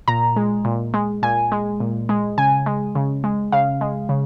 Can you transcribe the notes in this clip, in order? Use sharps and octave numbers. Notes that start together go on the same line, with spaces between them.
A#2 A#5
G#3
A#2
G#3
A#2 G#5
G#3
A#2
G#3
C#3 G#5
G#3
C#3
G#3
C#3 F5
G#3
C#3